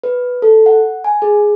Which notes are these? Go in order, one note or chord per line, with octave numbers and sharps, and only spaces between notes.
B4
A4
F#5
G#5
G#4